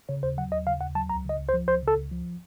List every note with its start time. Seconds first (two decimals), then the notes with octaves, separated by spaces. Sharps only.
0.09 C#3 C#5
0.23 D#2 C5
0.38 F#3 F#5
0.52 D#2 D#5
0.67 C#3 F5
0.81 D#2 F#5
0.95 F#3 A5
1.09 C#2 A#5
1.25 C#3 D#5
1.39 C#2
1.49 C5
1.54 F3
1.68 C#2 C5
1.83 C#3 A4
1.97 C#2
2.11 F3